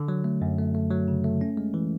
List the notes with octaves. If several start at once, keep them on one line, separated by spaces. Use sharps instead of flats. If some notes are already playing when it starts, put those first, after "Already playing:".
Already playing: D3
F#3
A3
F#2
A3
A3
F#3
C#3
A3
C#4
G#3
E3